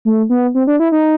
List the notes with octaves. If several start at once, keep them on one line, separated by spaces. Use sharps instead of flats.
A3
B3
C4
D4
E4
D#4